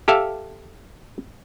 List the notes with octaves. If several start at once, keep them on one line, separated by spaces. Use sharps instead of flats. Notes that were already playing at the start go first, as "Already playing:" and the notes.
G4 A4 E5 F5